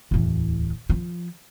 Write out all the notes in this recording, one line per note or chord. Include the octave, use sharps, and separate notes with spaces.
D1 E2
F3